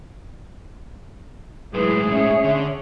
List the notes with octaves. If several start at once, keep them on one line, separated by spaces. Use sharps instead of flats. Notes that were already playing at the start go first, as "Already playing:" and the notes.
A2 E3 F#3 G#3 G#4 B4
C#4 C#5 E5
D3